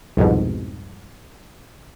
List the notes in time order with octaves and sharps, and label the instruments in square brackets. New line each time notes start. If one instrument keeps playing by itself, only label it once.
[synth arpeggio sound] C2 F2 G#2 B2